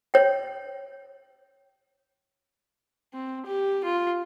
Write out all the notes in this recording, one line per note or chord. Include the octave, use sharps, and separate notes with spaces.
C#5 G5
C4
G4
F4